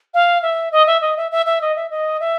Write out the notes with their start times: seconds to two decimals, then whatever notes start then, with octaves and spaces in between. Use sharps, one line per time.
0.14 F5
0.42 E5
0.72 D#5
0.87 E5
1.01 D#5
1.17 E5
1.31 E5
1.46 E5
1.61 D#5
1.76 E5
1.91 D#5
2.20 E5